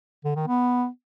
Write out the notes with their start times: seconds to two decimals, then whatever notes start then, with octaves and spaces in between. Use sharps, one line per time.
0.24 D3
0.36 D#3
0.47 B3